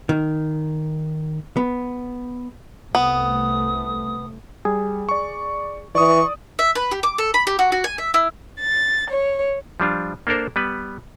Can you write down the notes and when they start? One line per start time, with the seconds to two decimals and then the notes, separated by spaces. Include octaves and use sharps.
0.09 D#3
1.57 B3
2.95 C2 A3 B3 D#6
4.65 G3 G#4
5.09 D5 C#6
5.95 E3 D5 C#6 D#6
6.59 E5
6.75 B4
6.91 G4
7.03 D6
7.18 A4
7.34 B5
7.47 G4
7.59 F#4
7.72 F#4
7.84 G#5
7.98 E5
8.14 E4
8.61 A6
9.10 C#5
9.80 F3 G3 D4 F4
10.27 A#3 D4 A4 A#4 C5
10.56 G3 B3 B4